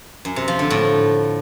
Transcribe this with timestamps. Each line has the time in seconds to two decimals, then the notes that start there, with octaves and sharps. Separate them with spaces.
0.25 F#2
0.36 C3
0.48 F3
0.59 D3
0.70 A2